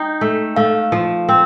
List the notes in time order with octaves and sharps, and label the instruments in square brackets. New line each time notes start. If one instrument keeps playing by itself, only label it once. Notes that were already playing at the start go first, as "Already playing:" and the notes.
Already playing: [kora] D#4 [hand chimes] G5
[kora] A3
[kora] A3 [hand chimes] F5
[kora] F3
C4